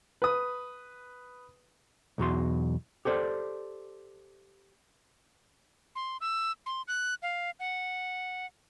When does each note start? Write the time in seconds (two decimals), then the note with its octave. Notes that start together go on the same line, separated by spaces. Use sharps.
0.22 B4 D#6
2.18 B1 E2 F#4 C6
3.05 G4 A4 C5 D5
5.96 C6
6.21 E6
6.66 C6
6.88 F#6
7.22 F5
7.60 F#5